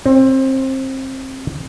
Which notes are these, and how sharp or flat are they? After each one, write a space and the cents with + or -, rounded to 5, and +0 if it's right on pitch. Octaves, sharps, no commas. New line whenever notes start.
C4 +25